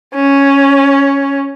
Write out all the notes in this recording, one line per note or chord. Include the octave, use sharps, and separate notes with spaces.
C#4